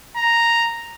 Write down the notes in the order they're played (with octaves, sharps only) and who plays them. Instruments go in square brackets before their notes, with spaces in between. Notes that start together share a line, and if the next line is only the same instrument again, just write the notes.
[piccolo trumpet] A#5